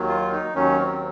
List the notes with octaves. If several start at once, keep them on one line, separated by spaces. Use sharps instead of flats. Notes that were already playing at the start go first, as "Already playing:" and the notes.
Already playing: D#2 D#3 F#3
F4
D#4
D#2 D#3 F#3 C#4
C4